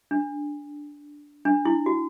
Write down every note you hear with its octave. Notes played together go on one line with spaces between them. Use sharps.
D4
D4
E4
F#4